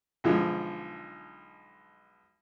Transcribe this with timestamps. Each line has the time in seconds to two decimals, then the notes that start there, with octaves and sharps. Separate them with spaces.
0.24 B1 D3 F3 G#3